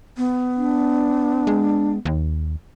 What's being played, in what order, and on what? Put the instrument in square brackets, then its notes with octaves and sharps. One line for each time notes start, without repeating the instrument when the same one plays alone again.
[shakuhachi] B3
[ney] D4
[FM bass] G#3
D#2